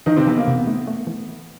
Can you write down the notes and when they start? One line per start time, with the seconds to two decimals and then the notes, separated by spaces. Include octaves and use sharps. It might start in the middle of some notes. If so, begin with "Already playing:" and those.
0.06 D#3 E3 D#4
0.17 C3 C4
0.27 E3 B3
0.38 A#3
0.46 C3 B3
0.67 A3
0.87 A3
1.07 E3